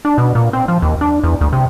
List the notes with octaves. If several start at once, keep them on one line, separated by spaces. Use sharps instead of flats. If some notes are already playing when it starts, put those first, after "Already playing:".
D4
B2
A#2
C4
F3
D#2
D4
E2
D2
C3